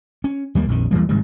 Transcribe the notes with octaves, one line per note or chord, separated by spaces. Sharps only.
C#4
D#2 G3 G#3 A#3
A#1 F2 D#3
E2 E3 G3 A#3
F1 G#2 D#3 G3